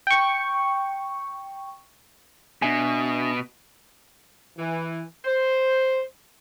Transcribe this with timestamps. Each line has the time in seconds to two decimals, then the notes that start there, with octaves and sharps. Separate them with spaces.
0.07 G5 C#6
2.62 B2 D4 E5 G#5
4.58 E3
5.25 C5